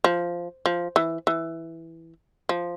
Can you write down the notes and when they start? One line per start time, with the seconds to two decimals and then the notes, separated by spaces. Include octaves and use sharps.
0.04 F3
0.66 F3
0.96 E3
1.27 E3
2.49 F3